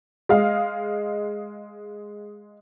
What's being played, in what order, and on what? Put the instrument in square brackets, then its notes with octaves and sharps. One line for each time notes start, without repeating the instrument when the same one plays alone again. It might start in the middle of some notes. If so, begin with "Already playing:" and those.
[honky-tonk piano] G#3 D#5 F5